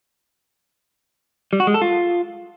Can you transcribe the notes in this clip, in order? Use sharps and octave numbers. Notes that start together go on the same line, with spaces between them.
G3
F#4
G#3
A4
F4